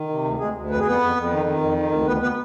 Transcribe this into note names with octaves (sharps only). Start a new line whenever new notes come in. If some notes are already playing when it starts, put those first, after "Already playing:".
Already playing: D#3
C3
D2
D2 G#3 G#4
D2
F2 B4
G#4
F2 B3 B4
F2
F2
D#3
D#3
F2
D#3
D2
D2 B3 B4
B3 B4